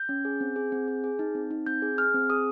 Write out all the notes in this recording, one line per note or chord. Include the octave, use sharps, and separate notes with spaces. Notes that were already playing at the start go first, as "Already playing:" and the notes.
Already playing: G6
C#4
G#4
C4
G#4
C4
G#4
G#4
D#4
C4
D#4
C4 G6
G#4
G#4 F6
C4
G#4 D#6